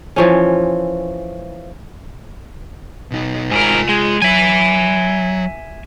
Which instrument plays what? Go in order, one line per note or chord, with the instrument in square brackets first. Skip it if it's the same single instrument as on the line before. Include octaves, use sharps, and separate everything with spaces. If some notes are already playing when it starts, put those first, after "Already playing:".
[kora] E3 F3 C#4
[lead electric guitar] B2 D#4
[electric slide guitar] G#2 A#4 [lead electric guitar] F4 G#5
[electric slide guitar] G#3
[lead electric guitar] F#3 [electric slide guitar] E5 G#5